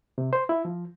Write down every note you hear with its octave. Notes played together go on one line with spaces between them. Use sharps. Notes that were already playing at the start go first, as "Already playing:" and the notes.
C3
C5
E4
F3